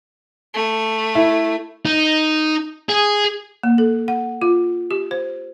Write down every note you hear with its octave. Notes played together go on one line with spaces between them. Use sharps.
A3
E4
D#4
G#4
A#3
A4
F#5
F4
G4
C5